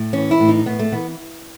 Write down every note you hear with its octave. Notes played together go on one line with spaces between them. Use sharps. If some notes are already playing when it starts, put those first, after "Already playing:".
Already playing: A2
E3 C#4
E4
A2
D#4
A2 B3
A3
E3 B3